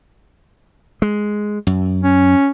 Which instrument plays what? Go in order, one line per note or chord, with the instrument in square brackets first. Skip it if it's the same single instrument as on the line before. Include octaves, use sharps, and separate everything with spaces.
[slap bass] G#3
F#2
[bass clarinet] C#4